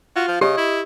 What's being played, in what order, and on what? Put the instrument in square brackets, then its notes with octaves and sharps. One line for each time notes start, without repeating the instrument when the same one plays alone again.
[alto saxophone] F4 [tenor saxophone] F#4
[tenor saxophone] F3
[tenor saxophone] C#3 [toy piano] G4 [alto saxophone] D#5
[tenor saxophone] E4